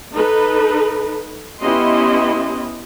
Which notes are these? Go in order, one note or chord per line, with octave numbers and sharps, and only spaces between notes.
D#4 A4 B4
B3 C#4 E4 G4 D#5 C6